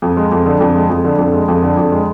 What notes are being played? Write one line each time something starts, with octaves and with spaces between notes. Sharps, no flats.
F2
G#3
F2
D3
F2
G#3
F2
D3
F2
G#3
F2
D3
F2
G#3